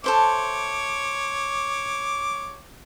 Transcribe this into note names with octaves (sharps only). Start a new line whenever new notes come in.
A4 C5 C#5 E5 D6